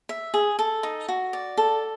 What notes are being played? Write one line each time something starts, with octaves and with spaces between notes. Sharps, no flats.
E5
G#4
A4
D#4
F#4
D5
A4